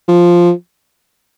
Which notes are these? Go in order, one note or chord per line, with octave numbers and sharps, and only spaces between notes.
F3